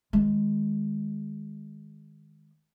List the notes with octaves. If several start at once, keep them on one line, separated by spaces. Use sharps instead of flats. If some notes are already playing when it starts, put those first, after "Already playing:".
D#3 G#3